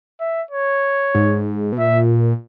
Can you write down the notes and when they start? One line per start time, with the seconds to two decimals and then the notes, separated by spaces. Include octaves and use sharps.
0.20 E5
0.51 C#5
1.15 G#2
1.72 B2
1.78 A#2 E5